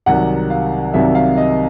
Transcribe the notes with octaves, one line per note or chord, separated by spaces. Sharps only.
C2 C3 D#3 F#3 F#5
F5
C2 C3 D#3 F#3 E5
F5
D#5